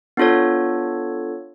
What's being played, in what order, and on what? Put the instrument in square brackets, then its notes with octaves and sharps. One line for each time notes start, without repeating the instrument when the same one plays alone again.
[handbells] B3 D4 F4 A4 C#5